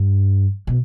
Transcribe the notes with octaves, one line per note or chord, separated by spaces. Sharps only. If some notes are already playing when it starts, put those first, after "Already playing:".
Already playing: G2
B2